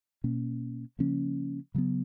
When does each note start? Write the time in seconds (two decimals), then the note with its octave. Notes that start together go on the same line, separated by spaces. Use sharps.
0.24 B2 A#3 C#4
0.99 C#3 F3 A#3 C#4
1.75 C#3 F#3 B3